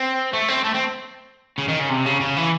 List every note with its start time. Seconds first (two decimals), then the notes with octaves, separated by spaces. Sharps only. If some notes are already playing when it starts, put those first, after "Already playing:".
Already playing: C4
0.33 A3
0.48 C4
0.64 A3
0.75 C4
1.58 C#3
1.68 D#3
1.79 C#3
1.90 C3
2.06 C#3
2.21 C#3
2.37 E3